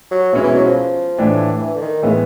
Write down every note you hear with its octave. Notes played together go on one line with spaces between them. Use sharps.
F#3
B2 E3 G#3 C#4 E4
E3
F#3
F3
A2 E3 A3 D4
E3
D3
D#3
A2 C#3 E3 G#3 B3